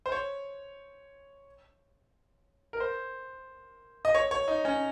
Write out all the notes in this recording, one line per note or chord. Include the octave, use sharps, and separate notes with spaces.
C5
C#5
A#4
C5
D#5
C#5
C#5
D#4
C#4